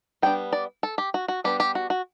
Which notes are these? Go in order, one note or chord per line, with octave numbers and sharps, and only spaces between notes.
G3 B3 D4 G5
D5
A4
G4
F#4
F#4
G3 B3 D4 G4
G4
F#4
F#4